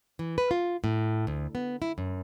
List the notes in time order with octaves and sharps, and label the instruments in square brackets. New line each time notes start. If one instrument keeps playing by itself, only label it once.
[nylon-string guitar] E3
B4
F4
A2
D2
B3
E4
F#2